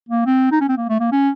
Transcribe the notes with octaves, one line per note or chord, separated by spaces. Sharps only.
A#3
C4
D#4
C#4
C4
A#3
A3
A#3
C#4